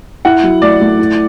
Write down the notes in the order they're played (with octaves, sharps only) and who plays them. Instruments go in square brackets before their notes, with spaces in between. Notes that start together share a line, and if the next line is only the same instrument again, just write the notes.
[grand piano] E4 [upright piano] F#5
[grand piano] F#3
[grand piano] A3 [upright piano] D5
[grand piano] A3
E4